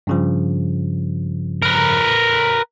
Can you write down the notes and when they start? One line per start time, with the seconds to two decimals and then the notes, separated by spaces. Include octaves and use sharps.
0.07 G2 C#3 F3
1.62 A#4 B4